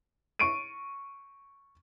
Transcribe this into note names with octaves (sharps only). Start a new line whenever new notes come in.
C#6 D7 D#7